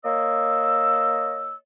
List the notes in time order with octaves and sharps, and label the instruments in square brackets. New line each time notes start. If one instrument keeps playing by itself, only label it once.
[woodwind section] A#3 C#5 D#5 E6